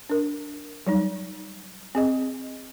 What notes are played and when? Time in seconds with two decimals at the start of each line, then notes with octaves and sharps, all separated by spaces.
0.10 D4 A#4
0.87 F#3 G3 D#4
1.95 C4 G#4 D#5